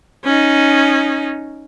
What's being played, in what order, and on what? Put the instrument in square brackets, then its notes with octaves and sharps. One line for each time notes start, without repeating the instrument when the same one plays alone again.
[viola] C#4 D#4